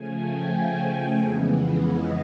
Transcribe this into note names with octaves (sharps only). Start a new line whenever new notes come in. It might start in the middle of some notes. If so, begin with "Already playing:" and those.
Already playing: C#3 F3 A3 G#5
G5
F2 C#3 E3 G#3 B3
D#5